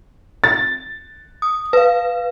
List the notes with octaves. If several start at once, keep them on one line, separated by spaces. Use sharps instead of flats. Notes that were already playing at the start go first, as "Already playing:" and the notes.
A6
D#6
B4 F5